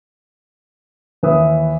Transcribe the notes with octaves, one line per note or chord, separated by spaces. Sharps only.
D#2 E3 B4 E5 D#6